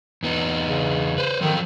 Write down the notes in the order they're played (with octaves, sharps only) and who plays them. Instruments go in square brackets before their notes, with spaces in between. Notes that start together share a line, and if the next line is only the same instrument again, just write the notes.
[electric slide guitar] E2 B3 D#4
[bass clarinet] C#3
[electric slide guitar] B4 C5
[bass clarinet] D#3 [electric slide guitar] F3 F#3 A4